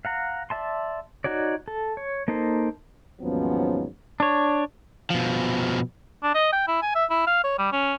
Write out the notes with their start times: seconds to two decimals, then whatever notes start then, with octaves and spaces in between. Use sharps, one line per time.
0.05 F5 F#5 A#5
0.50 D5 E5 A5 C6
1.24 D#4 F#4 C#5 D5
1.68 A4
1.97 C#5
2.28 A#3 D#4 A4 C5
3.22 D#2 G#2 F3 F#3 B3 C#4
4.20 D4 C#5
5.10 B2 F3
6.23 D4
6.35 D#5
6.52 G5
6.68 E4
6.82 G#5
6.95 E5
7.10 E4
7.27 F5
7.44 C#5
7.58 G3
7.72 C#4